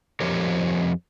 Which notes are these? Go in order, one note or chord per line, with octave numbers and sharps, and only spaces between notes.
F2 F3 G4 A#4 C#5